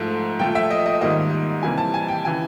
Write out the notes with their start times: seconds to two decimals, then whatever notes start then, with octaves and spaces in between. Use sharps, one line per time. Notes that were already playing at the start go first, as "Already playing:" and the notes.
Already playing: G#2 F3 A3
0.39 A#2 F3 A3 G5
0.55 E5
0.71 D#5
0.86 D#5
1.01 G#2 D#3 G3 A#3 D#5
1.63 C3 E3 G3 A#3 G#5
1.78 A5
1.94 G#5
2.08 G5
2.25 C#3 E3 G#5